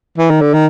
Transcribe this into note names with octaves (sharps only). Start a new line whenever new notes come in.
E3
D#3
D3
D#3